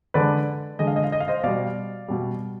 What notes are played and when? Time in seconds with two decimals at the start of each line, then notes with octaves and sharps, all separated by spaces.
0.14 D3 G#3 B4 D5
0.79 D3 G#3 D#5
0.87 F5
0.96 D#5
1.04 F5
1.12 D#5
1.20 F5
1.28 C5 D#5
1.43 B2 G3 D5 F5
2.08 B2 G3